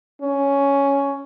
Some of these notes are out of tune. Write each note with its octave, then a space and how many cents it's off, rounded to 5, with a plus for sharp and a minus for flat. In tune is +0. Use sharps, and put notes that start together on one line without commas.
C#4 +5